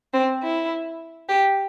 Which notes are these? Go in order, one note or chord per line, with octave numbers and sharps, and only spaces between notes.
C4
E4
G4